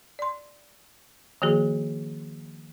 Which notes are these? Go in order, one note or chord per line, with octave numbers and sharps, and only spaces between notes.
D5 C6
D#3 F3 A#3 F#4 G#4